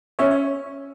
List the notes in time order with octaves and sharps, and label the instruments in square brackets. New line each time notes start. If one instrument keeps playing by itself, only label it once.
[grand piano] C#4 [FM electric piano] C#5 E5
[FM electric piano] C#5